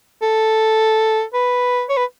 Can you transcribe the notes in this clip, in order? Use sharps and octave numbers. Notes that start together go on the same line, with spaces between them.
A4
B4
C#5
B4